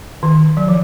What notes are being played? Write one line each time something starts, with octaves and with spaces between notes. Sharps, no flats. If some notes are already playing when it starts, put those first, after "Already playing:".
D#3
F#3
F3